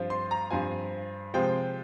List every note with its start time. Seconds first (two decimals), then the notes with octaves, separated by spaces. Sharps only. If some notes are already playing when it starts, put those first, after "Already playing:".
Already playing: G2 F3 C4 F4
0.10 C6
0.31 A#5
0.50 G2 F3 C4 F4 G#5
1.34 C3 F3 G#3 C4 G5